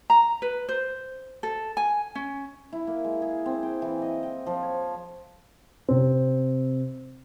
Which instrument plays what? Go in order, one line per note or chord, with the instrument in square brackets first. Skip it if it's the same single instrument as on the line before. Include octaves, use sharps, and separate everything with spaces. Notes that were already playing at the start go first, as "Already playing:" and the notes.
[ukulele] A#5
B4
C5
A4
G#5
C#4
[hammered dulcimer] E4
A#3
G#3
G#4
C4
G5
E3
D#5
G5
F3
C#5
[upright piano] C3 C4